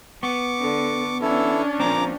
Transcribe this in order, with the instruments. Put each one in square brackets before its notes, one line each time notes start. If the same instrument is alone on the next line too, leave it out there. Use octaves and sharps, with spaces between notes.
[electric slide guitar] B3 [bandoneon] C#6 D6
[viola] D3
[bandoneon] E3 E4 A4 [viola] C#4 D4
[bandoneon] A#2 A#5 D6 [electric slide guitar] F3 A#3 C4